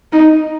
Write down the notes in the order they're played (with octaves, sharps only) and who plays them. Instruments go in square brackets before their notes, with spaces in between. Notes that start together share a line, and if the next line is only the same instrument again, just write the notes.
[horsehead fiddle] D#4